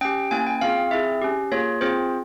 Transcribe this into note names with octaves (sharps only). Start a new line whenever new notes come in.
C#4 G4 G5
A#3 C#4 E4 G#5
G5
C4 F4 G#4 F5
C4 E4 G#4 E5
C#4 G4
A#3 F4 G#4 C#5
C4 F4 G#4 C5